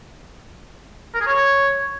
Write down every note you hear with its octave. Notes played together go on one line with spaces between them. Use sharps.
A#4
G#4
C#5